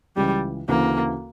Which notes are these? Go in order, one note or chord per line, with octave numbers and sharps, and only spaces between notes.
C#2 C#3 E3 G3
D2 C#3 E3 A#3